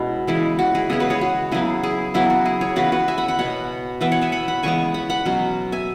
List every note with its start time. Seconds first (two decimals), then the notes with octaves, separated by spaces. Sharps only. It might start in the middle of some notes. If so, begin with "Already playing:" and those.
Already playing: B2 G#3 C#4 E4
0.27 C#3 E3 G#3 E4
0.59 F#4
0.75 E4 G#4
0.90 C#3 G#3 B3 E4 G#4
1.00 F#4 B4
1.10 G#4 C#5
1.21 F#4
1.52 C#3 F#3 B3 E4 G#4
1.83 E4 G#4
2.14 C#3 F#3 B3 E4
2.30 F#4
2.45 E4 G#4
2.61 G#4 C#5
2.76 C#3 E3 B3 F#4 B4
2.92 F#4 B4
3.08 E5 G#5
3.18 F#5 B5
3.28 F#5 B5
3.39 B2 B3 C#5 F#5
4.01 E3 B3 B4 E5
4.12 C#5 F#5
4.22 E5 G#5
4.32 F#5 B5
4.48 F#5 B5
4.63 C#3 E3 G#3 B3 G#5 C#6
4.94 F#5 B5
5.10 F#5 B5
5.25 B2 F#3 C#4
5.72 E5 G#5